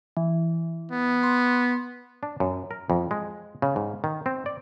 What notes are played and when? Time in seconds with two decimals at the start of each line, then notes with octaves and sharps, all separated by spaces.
0.17 E3
0.92 B3
1.23 C6
2.23 D4
2.40 F#2
2.71 A#4
2.90 F2
3.11 G#3
3.62 C#3
3.76 G#2
4.04 D#3
4.26 C4
4.46 D5